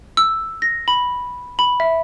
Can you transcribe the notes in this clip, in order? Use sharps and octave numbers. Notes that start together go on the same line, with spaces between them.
E6
A#6
B5
B5
E5